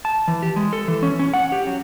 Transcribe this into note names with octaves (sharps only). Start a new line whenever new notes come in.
A5
E3
G4
G#3
A4
E3
C#4
C#4
F#5
G4
F#3